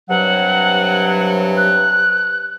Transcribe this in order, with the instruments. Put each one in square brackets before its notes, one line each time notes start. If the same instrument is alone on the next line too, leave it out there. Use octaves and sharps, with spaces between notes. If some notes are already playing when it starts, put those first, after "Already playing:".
[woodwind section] G2 C3 F#3 [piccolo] F#5
[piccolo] F#6